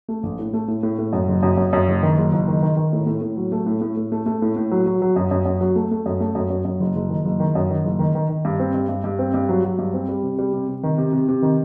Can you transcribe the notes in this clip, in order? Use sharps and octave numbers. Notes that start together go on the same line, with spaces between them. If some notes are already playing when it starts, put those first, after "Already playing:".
A3
A#1
A2
A3
A2
A2
A2
F#2
F#1
F#2
F#2
F#2
F#1
D#3
F#1
F#1
D#3
D#3
D#3
A2
A2
A2
F#3
A3
A2
A2
A2
A3
A3
A2
A2
F#3
F#3
F#3
F#2
F#2
F#2
F#3
A3
A3
F#2
A3
F#2
F#2
F#2
F#1
F#1
D#3
F#1
D#3
F#2
D#3
F#1
D#3
D#3
D#3
G2
C4
G2
G2
G2
C4
G2
F#3
F#3
G2
C4
G3
C3
G3
C3
C3
D#3
C3
C3
C3
D#3